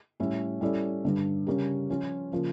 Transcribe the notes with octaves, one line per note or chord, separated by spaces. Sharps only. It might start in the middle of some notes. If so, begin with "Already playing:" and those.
A2 G3 C#4 E4
G3 C#4 E4 A4 D5
G2 D3 G3
C#3 G3 C#4 G4 A#4
F3 C#4 F4
C#3 F3 A#3